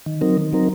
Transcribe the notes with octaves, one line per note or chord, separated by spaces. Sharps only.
D#3
F#3 C4 D#4 A#4
D#3
F#3 C4 D#4 A#4